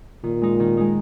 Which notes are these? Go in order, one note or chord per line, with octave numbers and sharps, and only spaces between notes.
A#2 D#3
G#3 D#4
D#3
G#3 D#4